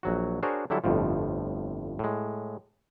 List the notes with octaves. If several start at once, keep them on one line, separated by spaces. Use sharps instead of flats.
A#1 F#3 F#4
D4 F#4 G#4 A#4 C5 C#5
D3 F#3 G3 E4 A4
G1 F2 A2 F3
A2 G#3